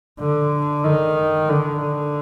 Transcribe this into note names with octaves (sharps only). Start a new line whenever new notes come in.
D3
D#3
D3